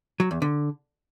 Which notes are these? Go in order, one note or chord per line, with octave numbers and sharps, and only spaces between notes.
F#3
E2
D3